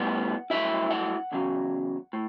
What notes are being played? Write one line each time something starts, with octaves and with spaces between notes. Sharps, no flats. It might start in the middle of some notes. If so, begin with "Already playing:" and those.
Already playing: A2 G3 B3 F#5
G2 D3 F#3 A3 E4 E5
F#5
E2 C#3 F#3
A2